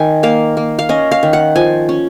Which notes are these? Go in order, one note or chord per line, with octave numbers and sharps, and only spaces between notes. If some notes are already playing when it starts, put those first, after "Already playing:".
Already playing: D#3 G#5
A#3 F5
A#3
F5
C#4 D#5
F5
D#3
F#5
F3 G#5
C#4